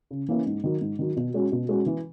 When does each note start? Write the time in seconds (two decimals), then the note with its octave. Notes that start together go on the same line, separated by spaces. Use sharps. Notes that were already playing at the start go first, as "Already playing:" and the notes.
0.11 C#3
0.28 E3 A#3 C#4 E4
0.46 G#2
0.64 D#3 F#3
0.81 G#2
0.99 D#3 F#3
1.17 B2
1.34 G#3 C#4 F#4
1.52 B2
1.69 G#3 C#4 F#4
1.86 E3